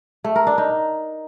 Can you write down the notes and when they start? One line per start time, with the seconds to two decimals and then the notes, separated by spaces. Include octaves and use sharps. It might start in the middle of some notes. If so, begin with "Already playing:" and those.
0.24 A3
0.36 A#4
0.47 D4
0.58 D#4